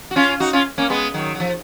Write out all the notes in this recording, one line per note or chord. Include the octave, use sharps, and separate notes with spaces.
F#4
C#4 F4
D#4 F#4
C#4 F4
A#3 C#4
G#3 B3
D#3 F#3
F#3
F3